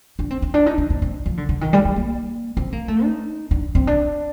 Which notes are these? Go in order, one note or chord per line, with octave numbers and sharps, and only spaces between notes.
D4
C4
C4
D4
D#4
D4
C4
C4
F3
D3
D3
D#3
G3
G3
A#3
C4
A#3
A3
D#4
D4
C4
D4